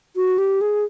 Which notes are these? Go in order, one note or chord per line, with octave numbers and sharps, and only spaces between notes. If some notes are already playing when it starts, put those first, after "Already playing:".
F#4
G4
G#4